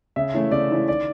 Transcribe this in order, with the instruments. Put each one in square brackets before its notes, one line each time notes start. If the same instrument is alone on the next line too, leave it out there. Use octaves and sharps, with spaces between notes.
[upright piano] C#3 [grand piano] E5
[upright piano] E3 A3 C#4 E4
[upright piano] C#3 [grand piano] D5
[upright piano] E3 A3 C#4 E4
[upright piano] D#3 [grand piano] D5